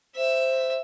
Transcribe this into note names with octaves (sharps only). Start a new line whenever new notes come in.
C5 E5